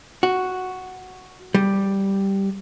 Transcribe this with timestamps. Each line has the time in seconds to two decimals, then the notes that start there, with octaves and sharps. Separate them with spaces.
0.23 F#4
1.54 G3